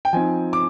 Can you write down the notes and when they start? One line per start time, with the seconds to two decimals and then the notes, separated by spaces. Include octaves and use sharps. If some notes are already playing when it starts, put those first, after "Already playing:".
0.05 G5
0.13 F3 C4 D#4 G#5
0.53 D6